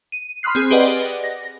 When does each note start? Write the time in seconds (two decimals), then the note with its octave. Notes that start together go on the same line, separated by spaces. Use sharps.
0.12 D#7
0.43 B5 C6 D#6 F6 F#6 C7
0.55 C4 G#4
0.70 G4 G#4 B4 D5 D#5 F#5
1.24 A#6